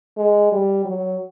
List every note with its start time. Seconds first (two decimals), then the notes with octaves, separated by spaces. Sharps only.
0.17 G#3
0.52 G3
0.85 F#3